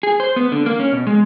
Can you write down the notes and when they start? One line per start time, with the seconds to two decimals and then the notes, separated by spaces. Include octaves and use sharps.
0.03 G#4
0.20 C5
0.36 B3
0.52 D3
0.66 A#3
0.80 C#4
0.93 B2
1.07 G#3